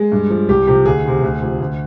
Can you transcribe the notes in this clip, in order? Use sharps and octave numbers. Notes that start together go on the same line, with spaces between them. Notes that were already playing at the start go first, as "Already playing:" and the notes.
Already playing: G#3
G2
F3
C2 G4
C3 F3 G4
D2 G#4
C3 D#3
D2
C3 F3
D2